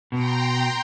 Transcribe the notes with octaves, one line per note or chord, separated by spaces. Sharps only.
B2 G5 A#5 C6